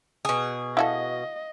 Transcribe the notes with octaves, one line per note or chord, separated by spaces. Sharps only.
B2 G#4
E4 F#4 A4 D#5 F5